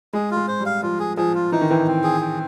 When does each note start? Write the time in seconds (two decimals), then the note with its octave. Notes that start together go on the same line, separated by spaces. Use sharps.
0.13 G#3 G#4
0.31 F4
0.36 G#3
0.48 C5
0.60 G3
0.66 F5
0.83 F3 F4
0.99 G#4
1.17 F3 G#4
1.35 F4
1.52 E3 D#4
1.61 D#3
1.69 E3 C4
1.86 C4
2.03 G#4
2.21 C4